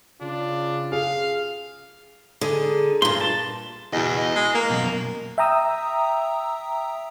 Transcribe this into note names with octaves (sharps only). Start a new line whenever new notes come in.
C#3 D4 F4
G#4 F5
D3 G#3 D#4 G#4
G2 A#2 C6
A5
E2 F#4 D#5
D#5
G#3
A#3
F#2 B2
E5 G5 A#5 D#6 E6